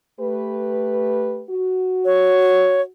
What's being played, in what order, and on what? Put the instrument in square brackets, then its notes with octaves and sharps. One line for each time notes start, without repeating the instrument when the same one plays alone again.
[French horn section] A3 G4 B4
F#4
[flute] C#5